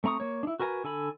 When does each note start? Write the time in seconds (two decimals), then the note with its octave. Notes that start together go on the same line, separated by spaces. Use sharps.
0.04 A3 C4 A#5 C#6 D#6
0.20 A#3 C#5
0.43 D4 E4
0.60 F#4 A#4 B4 G#5 A#5
0.84 D3 A4 G#5 B5